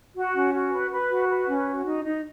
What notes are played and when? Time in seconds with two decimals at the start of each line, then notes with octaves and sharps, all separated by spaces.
0.15 F#4
0.35 C#4
0.53 F#4
0.72 B4
0.92 B4
1.10 F#4
1.29 B4
1.48 C#4
1.67 F#4
1.86 D#4
2.04 D#4